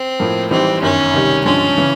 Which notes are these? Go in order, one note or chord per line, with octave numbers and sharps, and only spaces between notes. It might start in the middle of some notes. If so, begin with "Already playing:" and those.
Already playing: C4
A2 F3 A#3
G#1 G#2 E3 G3 C4
G1 F#2 D#3 C#4
C#2 C3 D#3 G3
G2 D3 F3 G#3 C4 C#4
C#3 E3